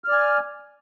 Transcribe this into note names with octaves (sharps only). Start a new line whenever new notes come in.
D5 G#5 F6